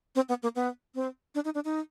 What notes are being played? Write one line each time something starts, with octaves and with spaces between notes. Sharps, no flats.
C4
B3
A#3
B3
C4
D4
D#4
D4
D#4